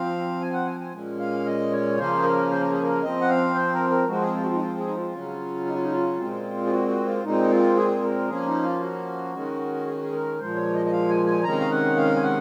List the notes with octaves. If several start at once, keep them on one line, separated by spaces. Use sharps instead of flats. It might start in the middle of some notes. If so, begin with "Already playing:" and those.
Already playing: F3 C4 F5
G#5
F#5
G#5
G#5
A#2 G#3 C#4
F5
D#5
C#5
C#3 F3 A#3 C#4 C5
G#4
A#4
C5
A#4
G#4
A#4
F3 C4 D#5
F#5
F5
C5
A#4
A#4
F3 G#3 C4 F#4
G#4
F4
F#4
F4
D#4
F4
G#4
D#4
F4
C#3 F#3 C#4
D#4
F4
D#4
F4
A#2 G#3 C4
G#4
F#4
F#4
F4
A#2 G#3 C4 D#4
F4
G#4
A#4
F3 A#3 C#4 G#4
D#4
F4
F#4
D#3 G#3 C#4
G#4
F#4
G#4
A#4
A#2 F3 G#3 C5
C#5
D#5
D#5
F5
G#5
G#5
C3 D#3 G#3 C#4 A#5
F5
F#5
F5
G#5
F#5